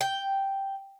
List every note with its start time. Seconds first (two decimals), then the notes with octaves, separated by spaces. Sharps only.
0.01 G5